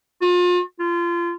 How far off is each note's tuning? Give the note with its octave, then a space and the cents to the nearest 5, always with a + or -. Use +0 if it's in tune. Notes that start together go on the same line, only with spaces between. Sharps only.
F4 +35
F4 -25